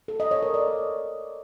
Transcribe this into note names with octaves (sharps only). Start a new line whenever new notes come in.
A4
D#5
C#5
A#4
D5